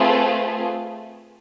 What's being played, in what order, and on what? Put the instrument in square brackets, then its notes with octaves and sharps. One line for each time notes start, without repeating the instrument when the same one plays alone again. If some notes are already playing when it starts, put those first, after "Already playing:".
Already playing: [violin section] A3 C4 F4 G#4 B4